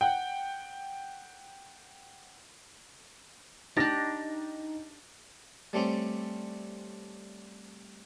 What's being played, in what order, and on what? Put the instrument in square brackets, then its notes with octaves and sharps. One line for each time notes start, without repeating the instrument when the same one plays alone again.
[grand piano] F#5 G5
[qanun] D4 G4 [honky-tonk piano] D#4 A6 A#6
[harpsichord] G3 A3 C4 C#4